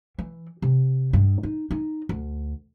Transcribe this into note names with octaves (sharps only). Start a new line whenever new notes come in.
E3
C3
G2
D#4
D#4
D2